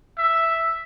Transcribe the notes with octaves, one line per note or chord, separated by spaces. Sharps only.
E5